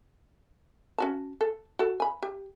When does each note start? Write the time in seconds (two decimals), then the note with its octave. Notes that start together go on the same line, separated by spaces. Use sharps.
0.98 C#4 F#4 A5
1.41 A4
1.79 F#4 A4
2.00 G#5 B5
2.22 G4